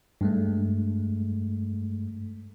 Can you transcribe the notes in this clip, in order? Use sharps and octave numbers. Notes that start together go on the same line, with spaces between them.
G2 G#3 A3